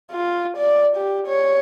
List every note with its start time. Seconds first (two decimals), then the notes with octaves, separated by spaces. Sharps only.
0.11 F4
0.57 D5
0.96 G4
1.27 C#5